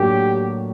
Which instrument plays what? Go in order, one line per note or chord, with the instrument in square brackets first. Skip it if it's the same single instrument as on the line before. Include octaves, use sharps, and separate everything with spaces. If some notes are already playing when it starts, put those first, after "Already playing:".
Already playing: [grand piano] A2 F#3 A#3 D4 [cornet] G4